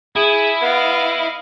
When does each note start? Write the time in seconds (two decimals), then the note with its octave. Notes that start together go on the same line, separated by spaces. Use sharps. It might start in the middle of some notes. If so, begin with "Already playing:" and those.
0.16 E4 G#4
0.62 B3 D#5 F5